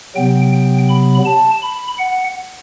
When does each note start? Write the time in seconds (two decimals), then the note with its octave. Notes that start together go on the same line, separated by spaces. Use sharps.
0.16 C3 F#3 B3 G5
0.52 G5
0.89 B5
1.26 A5
1.62 B5
1.98 F#5